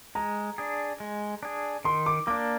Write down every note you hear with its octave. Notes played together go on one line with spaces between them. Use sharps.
G#3 A#5
D4 G#4
G#3
D4 G#4
D#3 C6
D6
A#3 D4 D6